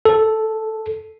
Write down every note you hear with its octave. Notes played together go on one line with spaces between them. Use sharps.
A4